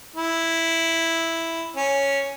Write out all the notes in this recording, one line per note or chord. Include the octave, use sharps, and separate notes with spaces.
E4
C#4